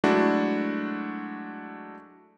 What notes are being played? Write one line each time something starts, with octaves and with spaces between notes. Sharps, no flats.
F#3 G#3 A3 D4 E4 F#4